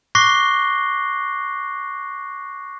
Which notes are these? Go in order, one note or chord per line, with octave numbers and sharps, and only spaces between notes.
C#6 D6 F#6 A#6 C7 G7